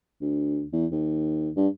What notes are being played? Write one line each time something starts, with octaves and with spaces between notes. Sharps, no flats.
D2
E2
D#2
G2